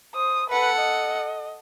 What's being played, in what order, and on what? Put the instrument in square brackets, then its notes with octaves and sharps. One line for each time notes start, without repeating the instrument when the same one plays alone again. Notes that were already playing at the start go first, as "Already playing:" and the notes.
[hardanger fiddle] C5 [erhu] D#6
[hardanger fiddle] A4 F#5 [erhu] B4
[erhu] D#5